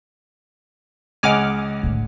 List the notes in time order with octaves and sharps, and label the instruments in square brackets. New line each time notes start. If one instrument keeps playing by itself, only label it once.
[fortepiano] C#2 D#5 F#5 [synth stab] G#5 D6 F6
[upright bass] A2 D3